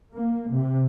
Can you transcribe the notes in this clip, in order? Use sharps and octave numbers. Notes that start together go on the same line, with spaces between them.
A#3
C3